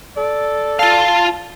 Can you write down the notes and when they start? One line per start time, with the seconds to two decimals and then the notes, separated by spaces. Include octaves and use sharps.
0.16 A4 D5
0.79 F4 F5 A5